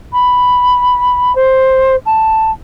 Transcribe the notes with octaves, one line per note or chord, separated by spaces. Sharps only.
B5
C5
A5